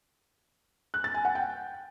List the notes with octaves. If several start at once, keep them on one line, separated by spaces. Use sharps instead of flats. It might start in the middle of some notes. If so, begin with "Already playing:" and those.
F#6
A6
G#5
F#5
G5